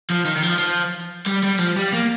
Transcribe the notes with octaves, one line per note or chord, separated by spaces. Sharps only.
F3
D#3
D#3
F3
F3
G3
G3
F3
G3
A#3